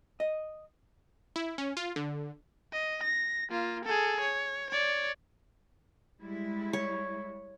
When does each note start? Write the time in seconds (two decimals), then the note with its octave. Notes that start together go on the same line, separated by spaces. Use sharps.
0.20 D#5
1.36 E4
1.58 C#4
1.77 F4
1.96 D3
2.73 D#5
3.03 A#6
3.50 A#3 F4
3.85 G#4 A4
4.20 C#5
4.70 C#5 D5
6.21 G3 G#3 E4
6.73 C#5